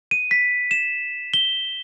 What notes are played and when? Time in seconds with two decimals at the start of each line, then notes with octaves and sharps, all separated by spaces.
0.11 D#7
0.31 B6
0.71 E7
1.34 G7